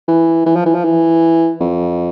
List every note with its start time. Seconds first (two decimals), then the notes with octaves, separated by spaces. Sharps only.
0.08 E3
0.46 E3
0.56 F3
0.66 E3
0.75 F3
0.84 E3
1.60 F2